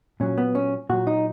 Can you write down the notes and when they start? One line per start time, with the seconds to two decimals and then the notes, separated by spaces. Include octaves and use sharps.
0.20 A#2 F#3 C#4
0.38 B3
0.55 C#4
0.89 A#2 F#3 F#4
1.07 D#4